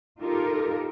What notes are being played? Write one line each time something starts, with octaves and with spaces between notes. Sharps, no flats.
D#4 F4 G4 A4 A#4